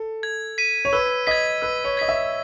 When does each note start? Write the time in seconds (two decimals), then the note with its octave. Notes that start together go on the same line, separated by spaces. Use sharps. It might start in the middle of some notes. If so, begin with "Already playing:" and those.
Already playing: A4
0.23 G#6
0.58 B6 D#7
0.85 C#5
0.93 B4 E6
1.27 D#5 G#6 B6
1.62 B4 E6
1.84 C#5
1.97 D#5 G#6 B6
2.08 E5